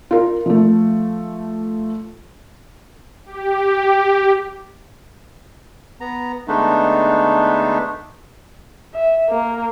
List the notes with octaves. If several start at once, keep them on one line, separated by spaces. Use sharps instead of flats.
F4 A#4
F3 A3
G4
B3 A#5
D3 G#3 A3 B3 D4 D#4
E5
A#3